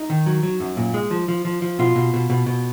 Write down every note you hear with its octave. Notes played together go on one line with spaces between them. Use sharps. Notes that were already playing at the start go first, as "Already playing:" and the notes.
Already playing: D#4
D#3
F#3
F#3
F#2
A#2
G#3
F3
F3
F3
F3
B2 F4
B2
B2
B2
B2